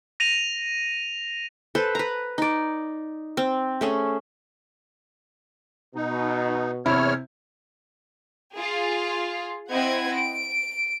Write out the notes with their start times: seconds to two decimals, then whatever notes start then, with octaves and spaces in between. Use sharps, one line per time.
0.20 A#6 D#7 F7
1.75 A4 B4 C5
1.95 B4 A#5
2.38 D#4 D5
3.37 C4
3.81 A3 C#4 G#4
5.95 B2 D#4
6.86 E2 C3 E4 C#5 F6
8.55 F4 G#4
9.69 C4 E4 D#5 F#5 G#6
10.14 D7